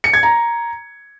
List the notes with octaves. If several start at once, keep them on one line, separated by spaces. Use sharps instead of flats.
C#7
G#6
A#5